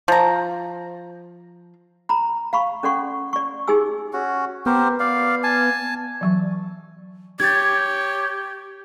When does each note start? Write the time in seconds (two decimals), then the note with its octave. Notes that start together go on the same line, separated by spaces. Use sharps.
0.08 F3 A#5
2.09 A#5 B5
2.53 F5 B5 C#6
2.83 C#4 A4 D5 F#5 C6 C#6
3.33 D5 C#6
3.67 D#4 G4 G#4 G#5 E6
4.13 C#4 F#4
4.66 B3 G4 A#4 C5
5.00 D5 F5
5.43 G#5 A5
6.21 E3 F#3 C#6
7.40 G4 C#5 G#6 A6